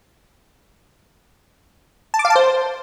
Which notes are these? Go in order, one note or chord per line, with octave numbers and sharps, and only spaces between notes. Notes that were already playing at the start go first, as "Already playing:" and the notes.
A5
D6
F5
A5
C5